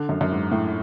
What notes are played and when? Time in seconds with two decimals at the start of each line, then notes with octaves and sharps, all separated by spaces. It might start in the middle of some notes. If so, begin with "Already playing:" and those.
Already playing: D3
0.09 F#2
0.21 F#2
0.32 G#2
0.52 A2